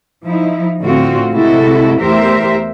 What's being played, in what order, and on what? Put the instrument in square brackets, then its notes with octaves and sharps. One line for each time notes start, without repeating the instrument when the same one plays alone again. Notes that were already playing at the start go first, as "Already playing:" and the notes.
[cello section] F3 D#4 E4
A2 D3 C4 F4 F#4
C3 G#3 E4 F#4 A4
E2 A3 G4 A#4 C5 E5